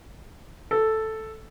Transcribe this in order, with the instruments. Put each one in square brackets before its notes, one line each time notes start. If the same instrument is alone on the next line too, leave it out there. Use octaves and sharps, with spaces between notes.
[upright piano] A4